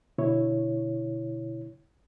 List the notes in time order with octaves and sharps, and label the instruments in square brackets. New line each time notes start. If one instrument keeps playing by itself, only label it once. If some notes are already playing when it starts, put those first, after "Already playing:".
[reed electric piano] B2 D3 E4 C#5